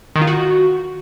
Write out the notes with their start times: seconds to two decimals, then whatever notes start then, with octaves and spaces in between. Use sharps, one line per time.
0.16 D#3
0.21 F4
0.27 F#4